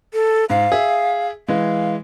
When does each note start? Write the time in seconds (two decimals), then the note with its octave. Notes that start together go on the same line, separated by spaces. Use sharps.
0.14 A4
0.50 G#2 F5
0.72 G#4 E5
1.48 E3 G#3 F5